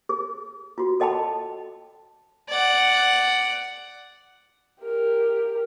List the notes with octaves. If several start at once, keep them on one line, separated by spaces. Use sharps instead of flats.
G#4
F4 F#4
A4 D#5 G5 A5 B5
D5 F#5
G4 A#4